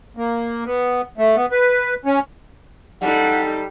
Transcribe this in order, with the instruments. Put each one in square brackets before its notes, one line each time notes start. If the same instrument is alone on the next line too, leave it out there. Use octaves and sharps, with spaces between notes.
[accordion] A#3
B3
A3
B3
B4
C#4
[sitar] G3 [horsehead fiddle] D#4 A4 [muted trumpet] F#5